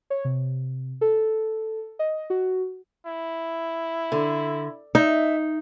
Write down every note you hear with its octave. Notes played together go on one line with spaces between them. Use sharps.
C#5
C3
A4
D#5
F#4
E4
D3
D#4 E5